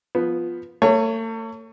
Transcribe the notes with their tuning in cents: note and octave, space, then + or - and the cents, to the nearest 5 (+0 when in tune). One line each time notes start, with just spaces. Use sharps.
F3 +0 B3 +0
A3 +40 C#5 +0